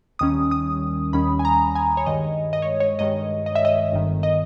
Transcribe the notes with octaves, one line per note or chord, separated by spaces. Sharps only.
D#2 D#3 G3 C#4 D#6
D#6
D#2 D#3 G3 C#4 B5
G#5
A#5
G#5
C#5
G2 D#3 G#3 D#5
D#5
C#5
C#5
G2 D#3 G#3 D#5
D#5
E5
D#5
G1 G2 D#3
D#5